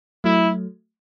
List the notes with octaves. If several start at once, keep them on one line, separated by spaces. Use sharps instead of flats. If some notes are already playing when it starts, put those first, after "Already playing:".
F#3 A3 E4